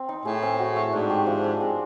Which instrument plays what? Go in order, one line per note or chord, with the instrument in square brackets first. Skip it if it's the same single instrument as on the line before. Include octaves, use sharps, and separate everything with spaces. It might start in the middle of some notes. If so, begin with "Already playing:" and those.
Already playing: [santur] C4
D#4
[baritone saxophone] A2 [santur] G#4
[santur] C4
F#4
A3
[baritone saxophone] G#2 [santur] D4
[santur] G4
F3
G#3
C4